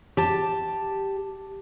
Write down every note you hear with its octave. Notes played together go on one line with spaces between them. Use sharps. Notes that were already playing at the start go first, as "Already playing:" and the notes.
G4 A5